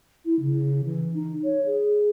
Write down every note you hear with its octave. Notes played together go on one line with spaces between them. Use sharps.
E4
C#3
E3
D#4
C#5
G#4